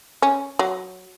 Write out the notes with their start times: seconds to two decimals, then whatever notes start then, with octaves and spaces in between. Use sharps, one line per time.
0.22 C#4
0.59 F#3